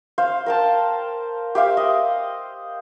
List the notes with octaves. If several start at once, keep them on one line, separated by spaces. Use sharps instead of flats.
C5 F5
A#4 G5 A5
G4 C5 E5 F5
D#5